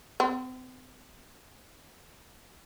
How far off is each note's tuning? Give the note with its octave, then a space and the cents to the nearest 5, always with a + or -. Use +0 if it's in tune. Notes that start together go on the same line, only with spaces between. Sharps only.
C4 -40